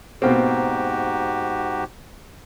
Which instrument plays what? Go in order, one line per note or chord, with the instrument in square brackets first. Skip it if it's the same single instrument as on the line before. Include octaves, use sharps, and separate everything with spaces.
[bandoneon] G#2 F#4 G4 [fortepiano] B2 A#3 C4